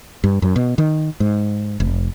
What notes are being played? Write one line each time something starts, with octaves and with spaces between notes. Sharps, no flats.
G2
F#2
B2
D#3
G#2
F1